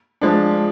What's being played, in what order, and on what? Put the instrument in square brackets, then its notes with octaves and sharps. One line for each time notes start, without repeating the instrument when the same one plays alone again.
[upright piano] F3 G#3 D4